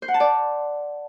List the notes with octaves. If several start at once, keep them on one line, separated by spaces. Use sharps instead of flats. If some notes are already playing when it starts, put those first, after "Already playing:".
C5
F#5
A5
D5